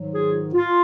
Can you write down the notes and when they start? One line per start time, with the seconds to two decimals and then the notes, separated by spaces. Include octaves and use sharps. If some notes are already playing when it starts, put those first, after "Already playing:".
Already playing: G#2 D#3 F#3
0.13 F4 G#4
0.54 F4